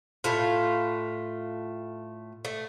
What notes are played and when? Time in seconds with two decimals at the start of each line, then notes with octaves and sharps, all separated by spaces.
0.24 A2 A3 F4
2.45 A3